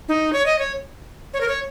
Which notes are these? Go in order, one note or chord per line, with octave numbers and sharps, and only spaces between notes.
D#4
C#5
D#5
C#5
C#5
A#4
C#5